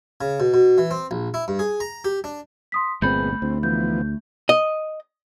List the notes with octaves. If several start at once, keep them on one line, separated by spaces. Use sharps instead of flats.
C#3
B2
B2
E3
C4
A#1
E4
G2
G#4
A#5
G4
D4
C6 D#6 B6
G1 A#2 G#3 A3 B3 C4 B5 G6
D2 C4
E3 F3 B3 G6
D#5